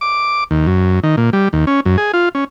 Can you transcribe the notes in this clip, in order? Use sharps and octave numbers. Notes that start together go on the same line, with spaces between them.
D6
D#2
F#2
D#3
A#2
G3
D#2
C#4
F#2
G#4
F4
C#4